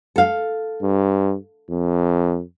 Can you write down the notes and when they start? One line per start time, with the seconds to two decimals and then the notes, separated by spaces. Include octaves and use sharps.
0.16 A4 F5
0.82 G2
1.69 F2